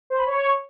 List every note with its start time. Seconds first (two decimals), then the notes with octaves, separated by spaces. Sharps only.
0.10 C5
0.18 B5
0.26 C#5